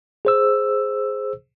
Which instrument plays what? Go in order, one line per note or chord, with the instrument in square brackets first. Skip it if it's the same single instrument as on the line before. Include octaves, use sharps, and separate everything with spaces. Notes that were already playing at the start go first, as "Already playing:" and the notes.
[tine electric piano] G#4 C5 E6